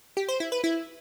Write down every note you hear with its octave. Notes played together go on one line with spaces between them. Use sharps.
G4
C5
E4
B4
E4